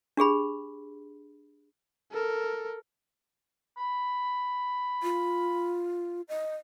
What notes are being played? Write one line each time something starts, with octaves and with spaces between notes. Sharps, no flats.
D4 G4 G#4 B5
A4 A#4
B5
F4
D#5